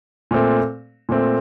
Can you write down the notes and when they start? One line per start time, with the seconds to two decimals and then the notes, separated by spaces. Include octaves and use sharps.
0.31 A#2 A3 C4
1.09 A#2 A3 C4